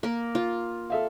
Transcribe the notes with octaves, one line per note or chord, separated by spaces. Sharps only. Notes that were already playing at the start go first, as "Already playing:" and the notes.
A#3 A#4
F4
A4 E5 F5